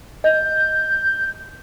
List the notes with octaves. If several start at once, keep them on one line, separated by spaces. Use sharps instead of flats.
D#5 G6